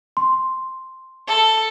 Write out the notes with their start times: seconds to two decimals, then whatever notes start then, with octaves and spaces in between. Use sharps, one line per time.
0.17 C6
1.27 A4